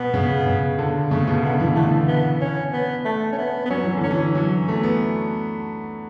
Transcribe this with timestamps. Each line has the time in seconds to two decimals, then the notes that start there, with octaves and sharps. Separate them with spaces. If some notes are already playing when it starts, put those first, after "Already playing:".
Already playing: B2 B3
0.14 C#3
0.46 C#3
0.79 D3
1.11 C#3 A3
1.27 B2
1.43 D3 B3
1.60 E3
1.76 D3 A3
2.08 B3
2.41 C#4
2.73 B3
3.05 A3
3.32 C#4
3.38 B3
3.65 B3
3.70 F#3 C#4
3.84 E3
3.97 D3
4.03 C#4
4.11 E3
4.35 F#3 C#4
4.68 A3
4.83 B3